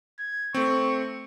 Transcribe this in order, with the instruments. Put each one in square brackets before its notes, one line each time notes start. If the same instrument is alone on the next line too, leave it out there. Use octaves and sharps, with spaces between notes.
[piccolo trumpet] G#6
[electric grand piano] A3 C4 [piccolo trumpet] C#6